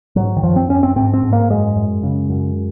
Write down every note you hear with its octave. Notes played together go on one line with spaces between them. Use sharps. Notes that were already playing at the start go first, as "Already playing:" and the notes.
G#2 F#3
D#3
F#2 F3
C4
F#2 C#4
C4
G#2 C4
C4
G#2
A#3
F#2 G#3
F#2
C#3
F#2